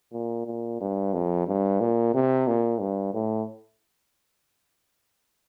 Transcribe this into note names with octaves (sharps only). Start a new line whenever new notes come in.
A#2
A#2
G2
F2
G2
A#2
C3
A#2
G2
A2